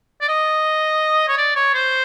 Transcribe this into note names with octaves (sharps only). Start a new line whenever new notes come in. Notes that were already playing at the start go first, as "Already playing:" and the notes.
D5
D#5
C#5
D5
C#5
C5